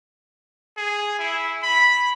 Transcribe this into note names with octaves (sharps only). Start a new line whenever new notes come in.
G#4
E4
B5